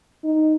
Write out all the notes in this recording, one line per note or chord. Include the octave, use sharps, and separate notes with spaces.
D#4